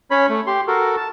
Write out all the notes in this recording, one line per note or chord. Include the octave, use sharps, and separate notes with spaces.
C#4 C#5 B5
A3
G4 C6
F#4 A4 A#4
A5